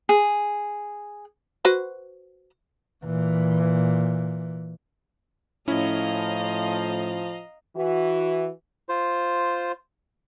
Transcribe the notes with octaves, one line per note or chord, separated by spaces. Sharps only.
G#4
F#4 B4 C5
A#2 E3
A2 F3 C#4 E4 D#5 F5 A#5
E3 F#4
F4 C5